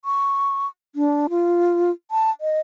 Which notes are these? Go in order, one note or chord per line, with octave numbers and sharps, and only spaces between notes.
C#6
D4
F4
A5
D#5